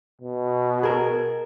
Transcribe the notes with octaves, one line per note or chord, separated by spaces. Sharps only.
B2
G#4 A#4